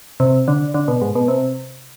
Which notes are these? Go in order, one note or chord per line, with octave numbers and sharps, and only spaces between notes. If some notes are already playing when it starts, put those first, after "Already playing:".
C3
D3
D3
B2
G#2
B2
C3